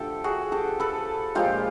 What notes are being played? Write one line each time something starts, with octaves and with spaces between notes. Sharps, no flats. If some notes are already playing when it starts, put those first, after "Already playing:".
Already playing: D3 F3 A3 G4 A4
F#4 G#4
G4 A4
A4 B4
A#2 F3 G#3 F4 G4